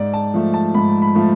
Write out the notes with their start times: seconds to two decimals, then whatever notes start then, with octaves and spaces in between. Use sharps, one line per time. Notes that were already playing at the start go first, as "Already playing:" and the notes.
Already playing: G#2 D5
0.14 A5
0.34 F3 A3
0.54 A5
0.74 G#2 B5
1.02 B5
1.15 F3 A3